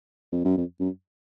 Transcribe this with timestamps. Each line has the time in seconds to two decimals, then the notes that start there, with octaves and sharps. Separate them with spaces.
0.32 F2
0.45 F#2
0.57 F2
0.80 F#2